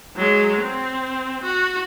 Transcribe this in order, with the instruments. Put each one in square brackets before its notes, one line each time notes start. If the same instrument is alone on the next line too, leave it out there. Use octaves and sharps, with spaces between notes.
[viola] F#3 G#3
C4
F#4